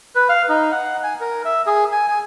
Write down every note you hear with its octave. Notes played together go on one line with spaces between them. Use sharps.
B4
F5
D#4
F#5
G#5
A#4
E5
G#4
G#5
G#5